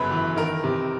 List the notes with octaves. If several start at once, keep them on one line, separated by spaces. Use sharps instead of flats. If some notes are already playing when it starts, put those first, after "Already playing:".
Already playing: G1 F#2 C#3 B4 B5
E3
D#3 A#4 A#5
C3